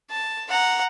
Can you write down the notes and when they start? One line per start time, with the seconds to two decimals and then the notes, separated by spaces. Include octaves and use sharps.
0.10 A5
0.50 F#5 A#5